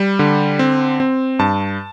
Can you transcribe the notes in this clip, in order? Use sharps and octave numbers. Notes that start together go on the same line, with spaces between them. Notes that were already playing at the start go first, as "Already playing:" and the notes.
Already playing: G3
D3
C4
C4
G2 A5